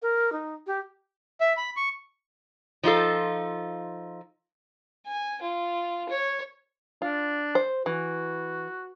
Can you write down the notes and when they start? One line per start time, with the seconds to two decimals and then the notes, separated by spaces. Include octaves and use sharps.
0.02 A#4
0.32 D#4
0.67 G4
1.41 E5
1.57 B5
1.77 C#6
2.84 F3 D#4 F4 A4
5.07 G#5
5.42 F4
6.09 C#5
7.02 D4 F4
7.55 C5
7.86 E3 F#4